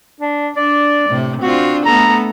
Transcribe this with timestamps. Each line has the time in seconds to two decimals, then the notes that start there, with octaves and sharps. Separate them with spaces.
0.21 D4
0.57 D4 D5
1.08 A2 C3
1.42 C4 D4 F4 F#4
1.86 A3 B3 A4 A#5